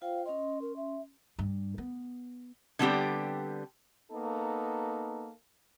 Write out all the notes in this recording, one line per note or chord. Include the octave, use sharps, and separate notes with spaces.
F4 C5 F5 G5
C#4 D#5 C6
A#4
E5
G2
B3
D3 G3 B3 C4 G4 D5
A#3 B3 D#4 A4